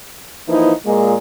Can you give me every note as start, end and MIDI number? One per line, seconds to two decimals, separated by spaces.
0.48 0.72 52
0.48 0.72 53
0.48 0.72 58
0.48 0.72 63
0.48 0.72 64
0.48 0.72 71
0.86 1.15 46
0.86 1.15 56